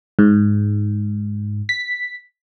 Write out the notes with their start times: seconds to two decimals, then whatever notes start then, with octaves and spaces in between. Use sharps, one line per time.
0.19 G#2
1.69 B6